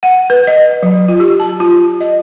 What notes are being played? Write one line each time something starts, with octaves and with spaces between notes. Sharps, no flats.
F#5
B4
D#5
F#3
F4
G4
A5
F4
D#5